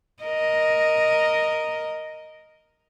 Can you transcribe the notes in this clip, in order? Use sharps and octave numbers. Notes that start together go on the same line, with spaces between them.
A#4 D#5